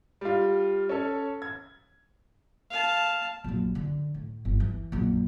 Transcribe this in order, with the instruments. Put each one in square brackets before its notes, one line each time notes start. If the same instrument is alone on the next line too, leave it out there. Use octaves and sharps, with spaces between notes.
[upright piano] G3 F4
C#4 A4 C#5
G#6
[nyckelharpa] F5 A5
[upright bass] A#1 F#2
D3
A2
G1
E3
A#1 F#2